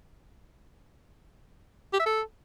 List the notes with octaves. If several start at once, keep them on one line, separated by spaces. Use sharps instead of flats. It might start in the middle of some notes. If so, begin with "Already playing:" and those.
G4
E5
A4